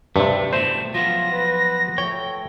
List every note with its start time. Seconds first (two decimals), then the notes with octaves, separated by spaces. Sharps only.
0.16 G2 C3 A3
0.53 B2 E3 A3 C5 E7
0.94 F3 F#3 B3 F4 A#6
1.32 B4
1.98 A3 C#5 G5